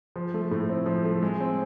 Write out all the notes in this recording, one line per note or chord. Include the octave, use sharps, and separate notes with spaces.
F3
A3
A2
C4
F3
A3
G#3
C4